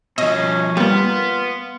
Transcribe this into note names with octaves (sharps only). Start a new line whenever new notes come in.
B2 F3 C#4 D#5
G3 A#3 B3 F4